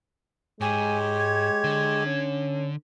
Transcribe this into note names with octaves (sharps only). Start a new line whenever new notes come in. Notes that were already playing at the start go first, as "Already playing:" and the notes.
G#2 G#3 G4 C#5 G#5
G#6
D3
C#4